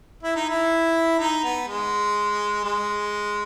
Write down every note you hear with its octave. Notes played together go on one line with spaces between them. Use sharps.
E4
D#4
E4
D#4
B3
G#3
G#3